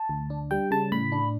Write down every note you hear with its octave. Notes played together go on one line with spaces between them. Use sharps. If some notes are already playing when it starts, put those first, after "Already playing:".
Already playing: A5
D2
D4
G3 G5
C#3 A5
A2 B5
D4